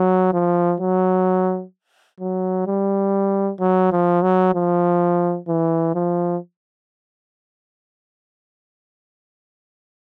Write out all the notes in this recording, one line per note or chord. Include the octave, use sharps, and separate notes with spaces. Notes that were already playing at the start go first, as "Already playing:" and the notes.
Already playing: F#3
F3
F#3
F#3
G3
F#3
F3
F#3
F3
E3
F3